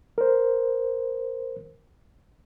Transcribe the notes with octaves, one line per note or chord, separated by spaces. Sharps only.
A#4 C5